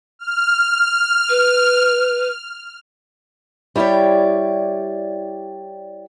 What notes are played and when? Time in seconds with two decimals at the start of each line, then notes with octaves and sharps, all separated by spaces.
0.19 F6
1.30 B4
3.76 G3 E4 G4 C#5 D5